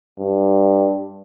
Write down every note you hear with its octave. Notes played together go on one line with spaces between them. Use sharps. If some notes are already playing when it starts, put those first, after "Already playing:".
G2